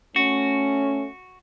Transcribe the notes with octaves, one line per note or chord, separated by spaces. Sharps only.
A3 C#4 F#4